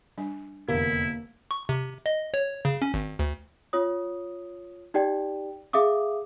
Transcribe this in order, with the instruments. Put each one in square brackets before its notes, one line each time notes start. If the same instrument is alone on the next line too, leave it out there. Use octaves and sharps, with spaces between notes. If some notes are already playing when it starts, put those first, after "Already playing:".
[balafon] G3 D4 G#5
[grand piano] F1 E2 D3 [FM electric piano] A#3 [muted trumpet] E4
[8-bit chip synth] C#6
C3
D#5
C#5
C#3
C#4
G#1
D2
[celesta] F4 C#5 D#6
D#4 G4 D5 G5
G#4 E5 F5 D6 D#6